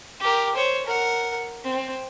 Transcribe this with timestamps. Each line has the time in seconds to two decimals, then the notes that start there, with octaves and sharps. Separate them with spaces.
0.20 G4 A#4
0.55 C5 C#5
0.86 A#4 F#5
1.65 C4